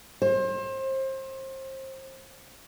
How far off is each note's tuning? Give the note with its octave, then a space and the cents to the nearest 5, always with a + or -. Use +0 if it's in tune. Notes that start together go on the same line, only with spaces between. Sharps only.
C5 +30